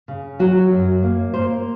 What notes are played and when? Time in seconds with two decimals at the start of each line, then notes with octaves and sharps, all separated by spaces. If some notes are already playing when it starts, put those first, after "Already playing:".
0.08 C#3
0.39 F#3 F#4
0.71 F#2
1.03 A#3
1.34 A#3 C5